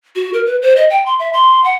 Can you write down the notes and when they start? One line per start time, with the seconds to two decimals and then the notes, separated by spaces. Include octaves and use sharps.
0.15 F#4
0.33 A#4
0.46 B4
0.62 C5
0.76 D#5
0.90 G5
1.06 C6
1.19 E5
1.33 C6
1.64 F#5